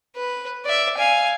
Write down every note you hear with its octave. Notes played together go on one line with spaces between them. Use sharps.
B4
D5 E5
F5 G#5